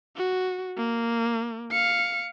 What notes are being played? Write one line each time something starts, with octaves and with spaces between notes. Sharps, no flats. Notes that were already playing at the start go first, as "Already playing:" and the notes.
F#4
A#3
F5 C#7